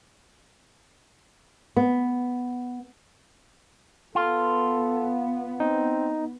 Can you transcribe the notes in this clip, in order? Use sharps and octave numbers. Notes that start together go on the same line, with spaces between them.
B3
B3 F4 A4
C4 D#4